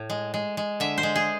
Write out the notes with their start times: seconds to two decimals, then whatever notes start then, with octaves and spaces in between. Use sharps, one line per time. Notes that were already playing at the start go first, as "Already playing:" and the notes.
Already playing: A2
0.10 G#3
0.34 G#3
0.57 G#3
0.80 D3 E5
0.98 C5
1.03 G#3
1.16 G#4